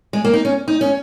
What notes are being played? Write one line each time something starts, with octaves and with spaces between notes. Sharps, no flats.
G#3
A#3
D#4
C#4
D#4
C#4